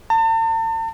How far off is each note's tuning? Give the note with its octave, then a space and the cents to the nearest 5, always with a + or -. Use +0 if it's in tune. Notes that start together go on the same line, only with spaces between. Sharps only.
A5 +45